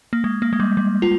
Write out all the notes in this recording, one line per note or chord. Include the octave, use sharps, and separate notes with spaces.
A#3
G#3
A#3
G#3
G3
G3
F4